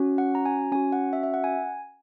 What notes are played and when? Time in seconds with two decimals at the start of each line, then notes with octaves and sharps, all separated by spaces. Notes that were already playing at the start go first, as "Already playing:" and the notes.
Already playing: C#4 F#4
0.18 F#5
0.35 A#5
0.45 G#5
0.72 C#4 F#4 G#5
0.92 F#5
1.13 E5
1.23 E5
1.34 F#5
1.44 G#5